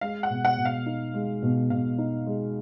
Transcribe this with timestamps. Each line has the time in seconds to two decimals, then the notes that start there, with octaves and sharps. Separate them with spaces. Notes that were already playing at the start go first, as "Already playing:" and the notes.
0.01 G#3 F5
0.23 F#5
0.30 B2
0.45 F#5
0.58 B2
0.65 F5
0.86 D#4
1.14 G#3
1.42 B2
1.70 B2 F5
1.98 D#4
2.27 G#3